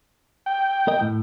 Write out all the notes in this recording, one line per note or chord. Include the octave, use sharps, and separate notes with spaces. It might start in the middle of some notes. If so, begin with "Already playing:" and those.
G5
A#4 D#5
A2